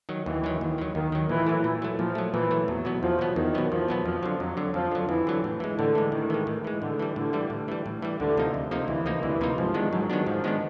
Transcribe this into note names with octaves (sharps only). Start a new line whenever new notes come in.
D#3 F#3
D#2 E3
D#3 F#3
D#2
D#3 F#3
D#2 D#3
D#3 F#3
A#2 E3
F#3 A3
A#2
F#3 A3
A#2 F3
F#3 A3
A#2 E3
F#3 A3
E2 F#3
B2 F#3 B3
E2 F3
B2 F#3 B3
E2 D#3
B2 F#3 B3
E2 F3
B2 F#3 B3
F2 F3
D3 F#3
F2 F#3
D3 F#3
F2 F3
D3 F#3
F2 E3
D3 F#3
A2
E3 G#3
A2 D3
E3 G#3
A2 D#3
E3 G#3
A2
E3 G#3
A2 D3
E3 G3
A2 D3
E3 G3
A2
E3 G3
A2
E3 G3
D2 D3
C3 F3 A#3 D#4
D2
C3 F3 A#3 D#4
D2 E3
C3 F3 A#3 D#4
D2 E3
C3 F3 A#3 D#4
G#2 F3
D#3 G#3 B3 D4
G#2 F#3
D#3 G#3 B3 D4
G#2 F3
D#3 G#3 B3 D4